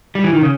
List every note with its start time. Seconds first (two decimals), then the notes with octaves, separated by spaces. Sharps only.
0.15 G3
0.24 E3
0.33 D#3
0.41 C#3